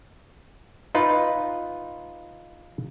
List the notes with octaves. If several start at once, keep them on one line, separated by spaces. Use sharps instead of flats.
D#4 F4 B4